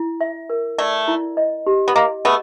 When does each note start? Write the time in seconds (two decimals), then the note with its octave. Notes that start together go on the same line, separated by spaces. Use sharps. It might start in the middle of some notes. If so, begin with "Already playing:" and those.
Already playing: E4
0.21 E5
0.50 A#4
0.78 A3 D5
1.08 E4
1.37 D#5
1.67 G4
1.88 B3
1.96 A#3 D#5
2.25 A3 B3 G#4